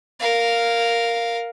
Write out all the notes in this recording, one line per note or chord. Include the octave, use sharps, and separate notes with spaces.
A#4 F5